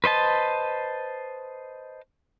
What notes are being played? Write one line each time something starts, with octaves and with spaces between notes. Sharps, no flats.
B4 C5 D#5 A5